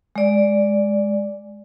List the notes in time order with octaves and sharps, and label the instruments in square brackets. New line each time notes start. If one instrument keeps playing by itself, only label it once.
[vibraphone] G#3 D5